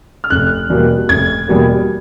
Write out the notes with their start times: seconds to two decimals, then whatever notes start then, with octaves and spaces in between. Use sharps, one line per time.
0.24 F6
0.30 F1 F#6
0.69 E2 B2 G3 A#3
1.09 F1 G#6
1.48 E2 B2 G3 A#3